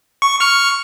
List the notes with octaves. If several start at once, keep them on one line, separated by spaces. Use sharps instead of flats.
C#6
C#6 F6 C#7